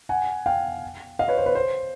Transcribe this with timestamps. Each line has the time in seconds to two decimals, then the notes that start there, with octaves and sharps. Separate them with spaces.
0.09 F#5 G#5
0.46 F5 G5
1.19 D#5 F5
1.28 B4 C#5
1.38 C5
1.46 B4
1.55 C5